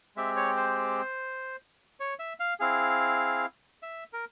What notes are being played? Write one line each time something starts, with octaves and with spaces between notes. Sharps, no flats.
G#3 C4 G4 E5
C#5
C5
C#5
E5
F5
C4 E4 G#4 F5
E5
A#4